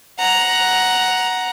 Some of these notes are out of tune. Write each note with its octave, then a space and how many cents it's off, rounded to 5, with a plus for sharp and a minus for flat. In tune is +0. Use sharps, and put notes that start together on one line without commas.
F#5 +0 A#5 +10